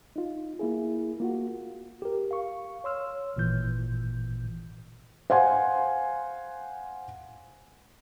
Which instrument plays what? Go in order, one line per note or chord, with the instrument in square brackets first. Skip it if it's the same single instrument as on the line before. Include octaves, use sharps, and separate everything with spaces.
[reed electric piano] D#4 F4
A#3 E4 G#4
A#3 F4 F#4
[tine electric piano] G4 A#4
F5 C#6
C#5 C6 E6 F6
G#1 A#2 E3 G6
[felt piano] C5 F5 F#5 G#5 C6